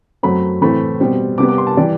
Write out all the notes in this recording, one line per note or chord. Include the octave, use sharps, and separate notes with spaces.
F#2 F#3 A3 C4 B5
A2 E3 A3 C4 B5
B2 G3 C4
C3 G3 B3 D6
D6
C6
A5
E3 G3 D5